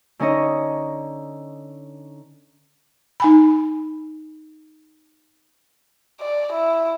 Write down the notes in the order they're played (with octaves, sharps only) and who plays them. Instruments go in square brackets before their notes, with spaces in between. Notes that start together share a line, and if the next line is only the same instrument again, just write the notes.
[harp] D3 C#4 D#4 C#5 D#5
[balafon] D#4 G#5 B5
[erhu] D5
E4